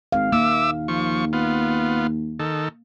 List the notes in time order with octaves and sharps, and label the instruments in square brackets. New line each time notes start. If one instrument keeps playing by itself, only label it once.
[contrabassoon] G#1 [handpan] F5
[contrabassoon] D#2 [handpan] A#3 [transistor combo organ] E5 D6 E6
[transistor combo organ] F3 C#6
B3 F4
D#3 A4